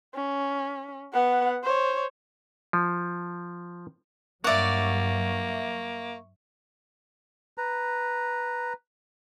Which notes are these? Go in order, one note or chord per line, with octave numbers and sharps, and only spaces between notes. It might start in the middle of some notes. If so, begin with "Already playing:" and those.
C#4
B3 F#5
C5 C#5
F3
G2 F#3 A#3 D5 E5 F#5 C#6
B4 A#5